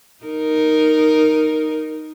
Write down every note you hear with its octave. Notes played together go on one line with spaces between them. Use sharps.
D#4 A#4